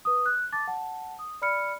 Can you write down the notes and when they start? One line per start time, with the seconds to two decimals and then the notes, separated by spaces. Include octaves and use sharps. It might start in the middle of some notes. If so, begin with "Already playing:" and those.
0.05 B4 D#6
0.26 F#6
0.52 A5 D6 A6
0.68 F#5 A5
1.19 D#6
1.42 D5 B5 F6 C#7